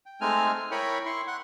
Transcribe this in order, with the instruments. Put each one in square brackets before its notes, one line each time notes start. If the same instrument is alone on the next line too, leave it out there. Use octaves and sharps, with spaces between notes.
[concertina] G5
G#3 A3 C4 D#4 G#5 F6
E4 A#4 C#5 G5 B5 C#6
E4 C6 C#6
F#5 C6